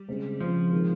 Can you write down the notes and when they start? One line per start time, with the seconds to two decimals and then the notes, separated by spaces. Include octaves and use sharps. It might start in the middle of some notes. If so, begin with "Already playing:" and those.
Already playing: G3
0.08 C#3 G#3 C4
0.40 C#3 F3 G#3 C4
0.72 D#3 G#3 C4 F4